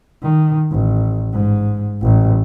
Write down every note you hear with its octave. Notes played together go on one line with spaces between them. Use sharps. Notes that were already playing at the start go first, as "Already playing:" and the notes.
D#3
A1
G#2
A1